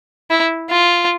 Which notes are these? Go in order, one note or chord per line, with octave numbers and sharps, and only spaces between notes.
E4
F4